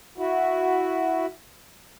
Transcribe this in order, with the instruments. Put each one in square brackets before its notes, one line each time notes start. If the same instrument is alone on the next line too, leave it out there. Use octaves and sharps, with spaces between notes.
[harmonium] E4 F#4